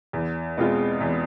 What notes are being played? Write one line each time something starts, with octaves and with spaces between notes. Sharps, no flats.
E2
B2 G#3 C4 F4
E2